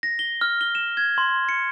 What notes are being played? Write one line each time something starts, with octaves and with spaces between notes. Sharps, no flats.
A#6
G7
F6
G7
E7
G#6
C6
C#7